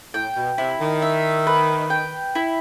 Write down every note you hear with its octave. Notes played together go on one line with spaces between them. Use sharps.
A2 G5
B2
C3 E4
D#3
E5
B4
G5
E4